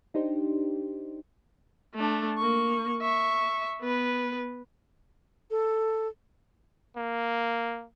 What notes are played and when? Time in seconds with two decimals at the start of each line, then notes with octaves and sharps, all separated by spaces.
0.14 D4 D#4 G4 C5
1.95 A3 D4
2.38 A#3 C#6
3.02 E5 C#6
3.81 B3 B4
5.51 A4
6.96 A#3